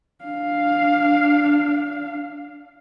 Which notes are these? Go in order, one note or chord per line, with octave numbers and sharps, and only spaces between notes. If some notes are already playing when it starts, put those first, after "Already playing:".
D4 F5